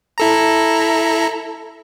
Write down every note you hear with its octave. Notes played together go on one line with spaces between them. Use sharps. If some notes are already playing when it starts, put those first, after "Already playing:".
E4 A4 A#5